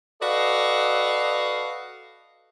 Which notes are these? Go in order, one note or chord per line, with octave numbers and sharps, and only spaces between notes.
F#4 A4 B4 D5 D#5 F5